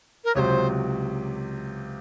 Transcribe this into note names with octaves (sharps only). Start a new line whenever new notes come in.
A#4
C#2 C3 F#3 C5 C#5